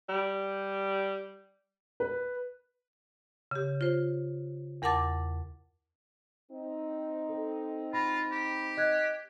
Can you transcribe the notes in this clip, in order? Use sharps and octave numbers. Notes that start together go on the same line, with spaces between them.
G3
B4
C#3 G4
F4 C5
E2 A#4 F#5 A5 D6 A6
C4 D#4
A4
F4 B5 A#6
G4
D#5 F#6 G#6